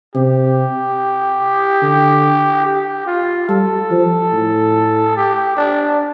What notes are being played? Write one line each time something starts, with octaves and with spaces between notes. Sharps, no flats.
C3 G4
D3
G4
F4
G3 A4
F3
A2
G4
D4